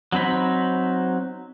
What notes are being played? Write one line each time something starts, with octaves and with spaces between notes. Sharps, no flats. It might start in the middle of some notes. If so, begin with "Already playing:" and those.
F#3 C4 D#4 B5